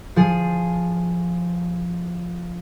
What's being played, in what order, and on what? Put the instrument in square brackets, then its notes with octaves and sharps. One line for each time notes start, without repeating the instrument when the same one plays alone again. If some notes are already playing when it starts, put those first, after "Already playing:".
[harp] F3 G#4